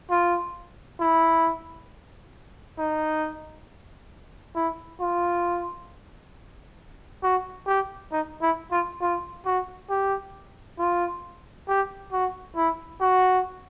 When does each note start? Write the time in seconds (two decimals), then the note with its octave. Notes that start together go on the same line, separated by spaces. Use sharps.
0.11 F4
1.01 E4
2.78 D#4
4.55 E4
5.01 F4
7.23 F#4
7.67 G4
8.12 D#4
8.42 E4
8.72 F4
9.01 F4
9.46 F#4
9.90 G4
10.79 F4
11.68 G4
12.12 F#4
12.56 E4
13.01 F#4